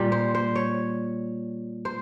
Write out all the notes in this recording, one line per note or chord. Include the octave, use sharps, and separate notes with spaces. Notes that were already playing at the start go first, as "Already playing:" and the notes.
Already playing: A#2 G3
C5
C5
C#5
C5